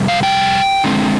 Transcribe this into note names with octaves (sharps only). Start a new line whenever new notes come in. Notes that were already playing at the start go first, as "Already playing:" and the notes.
Already playing: F2 C3 G3
F5
G5
D3 G#3 C4